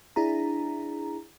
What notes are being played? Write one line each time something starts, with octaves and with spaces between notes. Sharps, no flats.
D4 E4 G#4 A#5